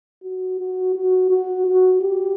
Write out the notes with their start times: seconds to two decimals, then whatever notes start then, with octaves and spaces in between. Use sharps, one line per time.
0.24 F#4
0.60 F#4
0.96 F#4
1.30 F#4
1.67 F#4
2.01 G4